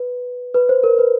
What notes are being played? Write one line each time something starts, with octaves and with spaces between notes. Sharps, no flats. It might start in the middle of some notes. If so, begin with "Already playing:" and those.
Already playing: B4
B4
C5
A#4
B4